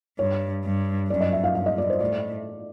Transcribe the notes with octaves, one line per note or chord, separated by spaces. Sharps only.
G2 C#5
G2
F#2 D5
D#5
E5
F5
G2 F5
D#5
D5
C5
A2 D5